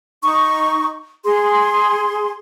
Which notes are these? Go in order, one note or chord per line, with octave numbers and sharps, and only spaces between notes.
D#4 C#6
G#4 C6